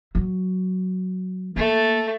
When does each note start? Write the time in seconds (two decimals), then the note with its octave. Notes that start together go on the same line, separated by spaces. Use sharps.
0.15 F#3
1.56 A3 A#3 A4